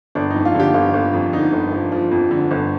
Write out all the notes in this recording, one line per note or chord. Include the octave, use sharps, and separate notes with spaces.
G1 D4
F2 D#4
F4
D3 G4
G1 F4
G1
F2
D3 D#4
G1
F3
F3
F2
D3
G1